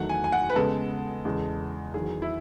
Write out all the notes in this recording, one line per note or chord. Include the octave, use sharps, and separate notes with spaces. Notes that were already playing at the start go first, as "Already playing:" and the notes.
Already playing: E2 D#3 F#3 A3 F#5
G#5
G#5
F#5
B4
C#3 G#3 B3 A4
E2 C#3 G#3
E2 D#3 F#3 G#4
E4